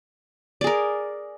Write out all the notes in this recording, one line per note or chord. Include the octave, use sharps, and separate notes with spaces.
G#4 A#4 D5